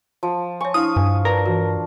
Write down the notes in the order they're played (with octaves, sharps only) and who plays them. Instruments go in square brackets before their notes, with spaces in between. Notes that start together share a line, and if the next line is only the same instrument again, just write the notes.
[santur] F3
[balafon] C#5 G#5 [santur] C#6
[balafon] D4 E4 [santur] F5 [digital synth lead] D#6
[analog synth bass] G2 [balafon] G#5
[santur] D4 [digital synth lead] A#4 [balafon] B4
[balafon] E3 F#4